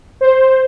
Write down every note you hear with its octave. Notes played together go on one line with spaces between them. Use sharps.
C5